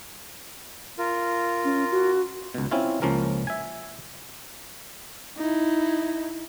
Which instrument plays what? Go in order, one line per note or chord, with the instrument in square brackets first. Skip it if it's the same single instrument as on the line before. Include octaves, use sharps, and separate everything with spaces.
[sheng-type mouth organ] F4 A#4
[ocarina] C#4
F#4
[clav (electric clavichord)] C#2 B2
C4 C#4 E4 F4
C#2 F3 A#3 C#4 A#4
E5 G#5
[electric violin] D#4 E4